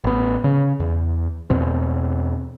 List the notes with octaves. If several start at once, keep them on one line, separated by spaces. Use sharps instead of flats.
A1 B3
C#3
E2
E2 B2 C4